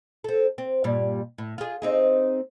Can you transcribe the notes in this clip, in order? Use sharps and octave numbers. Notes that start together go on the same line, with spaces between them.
C4 A4
C4
G2 A#2 G3
A2
F4 G#4
C4 D#4 G#4